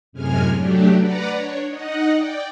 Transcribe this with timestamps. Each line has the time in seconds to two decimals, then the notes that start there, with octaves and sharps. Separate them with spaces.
0.12 F#2 A2 C3 G#3 G#5 F6
0.56 F#3 A3 D4 G4
0.99 B4 D5 F#5 A#5
1.35 D4 C#5
1.68 D#4 D#5 F#5
2.14 D5 G5